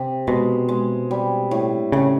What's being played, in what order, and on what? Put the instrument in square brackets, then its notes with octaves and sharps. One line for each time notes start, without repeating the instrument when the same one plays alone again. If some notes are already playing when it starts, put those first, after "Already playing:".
Already playing: [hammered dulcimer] C3
[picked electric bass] B2 [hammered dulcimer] G#3
[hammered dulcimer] G#3
G3
A2
[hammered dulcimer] A2 [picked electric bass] C#3